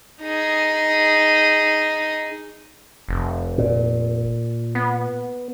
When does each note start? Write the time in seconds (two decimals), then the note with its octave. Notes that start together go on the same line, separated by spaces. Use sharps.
0.22 D#4 G#4
3.09 F1
3.58 A#2
4.75 B3